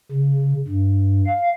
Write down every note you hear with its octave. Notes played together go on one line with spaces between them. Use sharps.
C#3
G2
F5